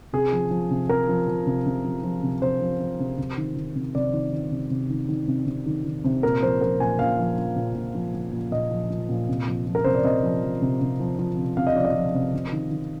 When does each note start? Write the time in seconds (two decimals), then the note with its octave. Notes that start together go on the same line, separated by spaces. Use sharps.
0.13 C3 G#4
0.32 F3
0.51 F3
0.70 C3
0.89 C3 A#4
1.09 F3
1.28 F3
1.46 C3
1.66 C3
1.84 F3
2.03 F3
2.23 C3
2.42 C3 C5
2.61 F3
2.80 F3
2.99 C3
3.18 C3
3.37 D#3
3.57 D#3
3.75 C3
3.95 C3 D5
4.13 D#3
4.33 D#3
4.51 C3
4.70 C3
4.90 D#3
5.09 D#3
5.28 C3
5.47 C3
5.66 D#3
5.85 D#3
6.04 C3
6.23 A#2 A#4
6.42 F3 C5
6.61 F3 A#4
6.80 A#2 G#5
6.99 A#2 F5
7.19 F3
7.38 F3
7.56 A#2
7.75 A#2
7.95 F3
8.14 F3
8.32 A#2
8.52 A#2 D#5
8.71 F3
8.90 F3
9.09 A#2
9.29 C3
9.47 F3
9.66 F3
9.75 A#4
9.84 C3 C5
9.95 D5
10.04 C3 D#5
10.23 F3
10.43 F3
10.62 C3
10.81 C3
11.00 F3
11.19 F3
11.37 C3
11.57 C3 F5
11.67 D#5
11.75 F3 D5
11.85 D#5
11.95 F3
12.14 C3
12.34 C3
12.52 D#3
12.71 D#3